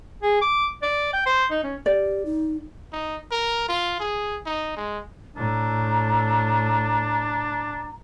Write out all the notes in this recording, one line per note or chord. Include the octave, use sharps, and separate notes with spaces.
G#4
D6
D5
G5
C5
D#4
C#4
G4 D5
D#4
D#4
A#4
F4
G#4
D#4
G#3
A2 D4 A#5